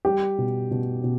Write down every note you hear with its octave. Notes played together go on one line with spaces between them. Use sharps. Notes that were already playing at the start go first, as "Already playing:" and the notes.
G3 G4
B2
B2
B2